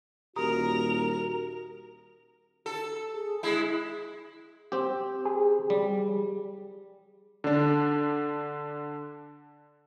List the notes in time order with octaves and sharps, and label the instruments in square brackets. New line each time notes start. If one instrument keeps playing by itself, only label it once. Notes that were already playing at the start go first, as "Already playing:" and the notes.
[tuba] D#1 [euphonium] F#4 [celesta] G4 A#5 D#6 [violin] A#4 F7
[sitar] A4
[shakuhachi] G#4
[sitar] G#3 E4
[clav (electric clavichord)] C4 G4
[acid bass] G#4
[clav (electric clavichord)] G3
[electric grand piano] D3 D4